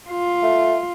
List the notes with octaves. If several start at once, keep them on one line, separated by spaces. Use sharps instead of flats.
F4
A3